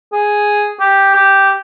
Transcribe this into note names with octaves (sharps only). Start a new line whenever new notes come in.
G#4
G4
G4